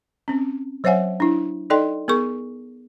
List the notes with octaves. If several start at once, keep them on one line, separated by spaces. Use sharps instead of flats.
C4 C#4
F#3 C5 C#5 E5 F#5 G#5
D4 E4
D#4 A4 D5 D#5 G5 C6
B3 G#4 A#4 C#6